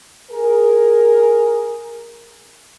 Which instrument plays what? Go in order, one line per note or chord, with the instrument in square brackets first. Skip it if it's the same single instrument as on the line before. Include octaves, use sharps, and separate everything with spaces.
[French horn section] G#4 A#4